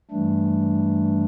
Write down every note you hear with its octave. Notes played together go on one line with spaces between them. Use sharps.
G2 E3 G3 A3 D4